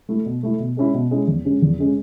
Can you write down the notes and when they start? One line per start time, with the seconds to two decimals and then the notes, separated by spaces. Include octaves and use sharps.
0.09 A3 E4
0.26 B2
0.43 A3 E4
0.59 B2
0.77 G#3 C#4 E4
0.94 B2
1.11 G#3 C#4 E4
1.27 E2
1.45 C#3 G#3 C#4
1.62 E2
1.79 C#3 G#3 C#4